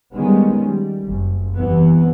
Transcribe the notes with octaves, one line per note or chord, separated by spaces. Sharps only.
D#3 G3 G#3 B3 C#4
G3
F#1
E2 G2 C3 E3 B3